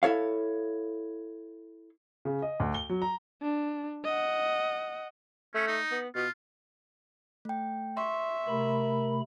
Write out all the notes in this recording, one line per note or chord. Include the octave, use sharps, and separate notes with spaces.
E4 A4 C#5 F5
C#3
D#5
D2
G7
F#3
A#5
D4
D#5 F#5
A3 C#4
D#4
B3
B2 F4
A3 G5
E5 C6 C#6
C3 A3 A#4 B5